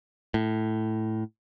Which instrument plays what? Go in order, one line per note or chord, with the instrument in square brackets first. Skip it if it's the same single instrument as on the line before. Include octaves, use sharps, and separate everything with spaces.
[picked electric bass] A2